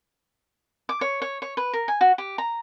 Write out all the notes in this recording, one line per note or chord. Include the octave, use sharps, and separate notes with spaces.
D6
C#5
C#5
C#5
B4
A#4
G#5
F#4
G4
A#5